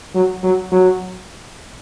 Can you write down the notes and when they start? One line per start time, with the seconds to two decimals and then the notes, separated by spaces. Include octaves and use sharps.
0.15 F#3
0.43 F#3
0.71 F#3